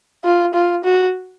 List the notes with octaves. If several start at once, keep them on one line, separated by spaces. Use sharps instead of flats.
F4
F4
F#4